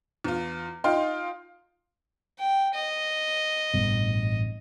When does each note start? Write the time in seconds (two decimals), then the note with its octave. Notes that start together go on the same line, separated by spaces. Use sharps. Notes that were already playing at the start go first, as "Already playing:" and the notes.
0.24 E2 F4
0.84 D#4 F4 F5 G5 C6
2.39 G5
2.75 D#5
3.74 A1 G2 B2